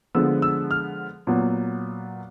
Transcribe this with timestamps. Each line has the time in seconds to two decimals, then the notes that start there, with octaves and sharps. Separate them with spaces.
0.15 D3 F3 G#3 B3 E6
0.42 E6
0.71 F6
1.27 A#2 F#3 B3